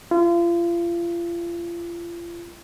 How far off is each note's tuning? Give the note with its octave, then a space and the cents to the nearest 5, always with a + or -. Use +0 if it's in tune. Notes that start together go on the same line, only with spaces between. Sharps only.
F4 -35